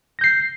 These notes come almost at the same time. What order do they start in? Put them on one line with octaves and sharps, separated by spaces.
A#6 G6 C7